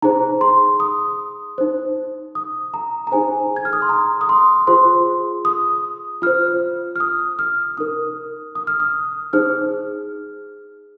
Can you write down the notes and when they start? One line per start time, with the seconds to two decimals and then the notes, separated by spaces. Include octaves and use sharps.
0.02 D#4 G#4 C5 A#5
0.41 C6
0.80 D#6
1.58 D#4 C5
2.35 D#6
2.74 A#5
3.07 A#5
3.12 D#4 G#4 C5 G#5
3.56 G#6
3.65 F6
3.73 D#6
3.82 C6
3.89 A#5
4.21 D#6
4.29 C6
4.67 F4 G#4 C5 C6
5.45 D#6
6.22 F4 C5 F6
6.96 F6
7.00 D#6
7.39 F6
7.77 D#4 A#4 D#6
8.55 D#6
8.67 F6
8.80 D#6
9.33 D#4 G#4 C5 F6